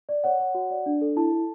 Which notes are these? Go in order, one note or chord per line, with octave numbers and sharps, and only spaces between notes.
D5
C#5 F#5
C#5
F#4
D5
D4
A4
E4 A5
A4